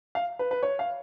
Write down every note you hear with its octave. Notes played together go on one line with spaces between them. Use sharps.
F5
B4
B4
C#5
F5